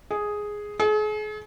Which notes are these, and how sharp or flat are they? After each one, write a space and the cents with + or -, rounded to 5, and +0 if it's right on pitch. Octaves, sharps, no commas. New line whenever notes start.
G#4 +0
G#4 +40